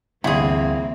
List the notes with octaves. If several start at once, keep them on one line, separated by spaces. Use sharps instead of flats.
G1 D2 C3 E3 A#3 C4 E4 G#4